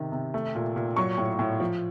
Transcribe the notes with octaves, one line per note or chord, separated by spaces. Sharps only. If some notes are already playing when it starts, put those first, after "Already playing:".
Already playing: C3 D#3
C3
A3
A#2
A#2
F#3 C#6
A2
A2
F3